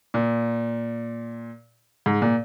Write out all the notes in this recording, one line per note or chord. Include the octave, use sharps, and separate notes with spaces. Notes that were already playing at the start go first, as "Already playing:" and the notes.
A#2
G#2
A#2